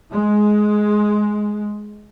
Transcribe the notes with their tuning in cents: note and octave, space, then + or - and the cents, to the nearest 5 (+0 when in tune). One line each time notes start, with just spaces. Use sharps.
G#3 +10